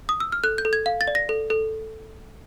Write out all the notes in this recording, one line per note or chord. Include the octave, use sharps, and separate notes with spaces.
D#6
E6
F6
A4 F#6
G6
A4
G#6
F5
A6
D5
A#6
A4
A4